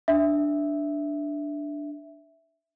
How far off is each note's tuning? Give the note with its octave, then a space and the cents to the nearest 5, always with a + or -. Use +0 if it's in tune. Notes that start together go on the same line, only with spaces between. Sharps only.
D4 +0 E5 +0